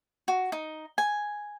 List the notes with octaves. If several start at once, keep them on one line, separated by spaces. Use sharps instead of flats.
F#4
D#4
G#5